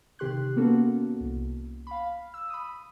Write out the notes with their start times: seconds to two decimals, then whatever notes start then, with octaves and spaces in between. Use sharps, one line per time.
0.19 C3 D#3 G4 C6 F#6
0.56 A#3 B3 C#4 F#4 A4
1.20 C2
1.87 F5 B5
2.34 E6
2.50 B5 D#6